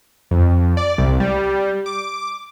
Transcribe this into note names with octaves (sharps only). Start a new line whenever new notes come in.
F2
D5
C2
G3
D6